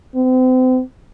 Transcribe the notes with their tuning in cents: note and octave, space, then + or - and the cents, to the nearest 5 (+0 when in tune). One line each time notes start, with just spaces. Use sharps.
C4 -35